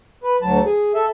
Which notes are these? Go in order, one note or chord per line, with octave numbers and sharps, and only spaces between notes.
B4
D2 F#3 A5
G#4
A4 E5